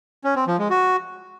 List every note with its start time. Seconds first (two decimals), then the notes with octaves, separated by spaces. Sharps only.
0.24 C#4
0.36 C4
0.47 F3
0.59 G#3
0.70 F#4